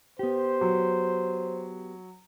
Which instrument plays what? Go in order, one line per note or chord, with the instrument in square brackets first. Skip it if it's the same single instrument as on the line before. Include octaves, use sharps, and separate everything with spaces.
[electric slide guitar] B3 G4 [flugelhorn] C5
[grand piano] F#3